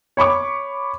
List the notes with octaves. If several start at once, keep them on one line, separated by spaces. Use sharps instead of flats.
C#5 B5 C#6 D6